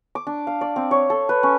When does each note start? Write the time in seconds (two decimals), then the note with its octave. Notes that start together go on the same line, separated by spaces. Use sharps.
0.15 D6
0.27 D4
0.47 F5
0.61 D5
0.76 C4
0.91 C#5
1.10 A4
1.29 B4
1.43 C#4